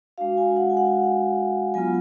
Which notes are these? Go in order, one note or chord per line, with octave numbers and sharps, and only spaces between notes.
G#3 D4 F#4 F5
G#5
F#5
G#5
F#5
F#3 B3 F4 G#5